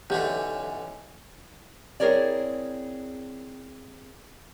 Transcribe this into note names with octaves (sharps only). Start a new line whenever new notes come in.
B1 D3 E3 A3 C#4 G4
C4 E4 G#4 A#4 C#5 D5